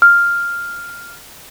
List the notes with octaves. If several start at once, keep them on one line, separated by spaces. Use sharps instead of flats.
F6